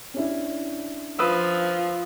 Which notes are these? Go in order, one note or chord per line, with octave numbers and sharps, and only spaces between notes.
C#4 D4 E4
F3 B4 D#6 E6